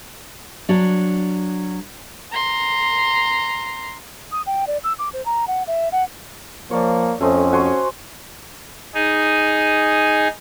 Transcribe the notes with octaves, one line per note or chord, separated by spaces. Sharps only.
F#3 D4
A#5 C6
D#6
G5
D5
E6
D6
C5
A#5
F#5
E5
F#5
F3 A#3 C#5 D5
F2 A3 C#4 C5 D#5
F#4 G#5 C6
D#4 G#4